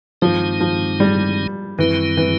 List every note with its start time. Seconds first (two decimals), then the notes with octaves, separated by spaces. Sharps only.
0.22 G2 D#3 F3 G#3 C4 D#4
0.61 F3
1.00 G3
1.78 F#2 D#3 E3 G3 C4 E4
2.17 E3